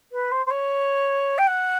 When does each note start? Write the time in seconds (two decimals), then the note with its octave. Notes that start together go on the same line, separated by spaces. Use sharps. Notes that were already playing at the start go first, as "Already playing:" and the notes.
0.12 B4
0.31 C5
0.46 C5
0.50 C#5
1.38 G5
1.47 F#5